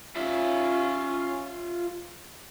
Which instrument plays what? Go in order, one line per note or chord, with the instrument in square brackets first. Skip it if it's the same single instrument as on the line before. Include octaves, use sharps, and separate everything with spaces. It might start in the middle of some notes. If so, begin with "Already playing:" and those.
[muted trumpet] C#4 [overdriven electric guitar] F4 E5